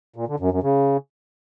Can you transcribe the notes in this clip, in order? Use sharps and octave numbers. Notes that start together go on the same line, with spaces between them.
A#2
D3
F#2
F#2
C#3